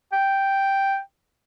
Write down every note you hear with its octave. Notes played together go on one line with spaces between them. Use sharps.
G5